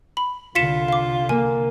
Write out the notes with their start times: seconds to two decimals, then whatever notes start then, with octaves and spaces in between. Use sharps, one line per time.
0.17 B5
0.55 C2 D3 F4 B6 C#7 E7
0.88 F5 D6
1.29 A#3 G#5